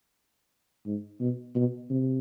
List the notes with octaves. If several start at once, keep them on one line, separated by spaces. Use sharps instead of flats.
G#2
B2
B2
C3